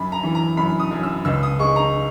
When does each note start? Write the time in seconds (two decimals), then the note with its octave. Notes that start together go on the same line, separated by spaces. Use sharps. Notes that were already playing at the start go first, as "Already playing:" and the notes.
Already playing: F#2 B5
0.12 A#5
0.23 E3
0.35 A#5
0.57 F#2 B5
0.80 D#6
0.91 F#2
1.03 E6
1.25 C#2 E6
1.43 D#6
1.59 G#3 C#6
1.76 A#5